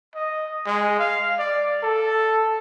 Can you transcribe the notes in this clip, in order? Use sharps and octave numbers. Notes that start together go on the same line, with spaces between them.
D#5
G#3
F5
D5
A4